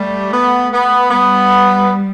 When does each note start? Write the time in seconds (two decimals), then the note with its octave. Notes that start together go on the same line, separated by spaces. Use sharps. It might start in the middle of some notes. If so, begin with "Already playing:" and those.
Already playing: G3 A3
0.33 B3
0.71 B3
1.10 G3 B3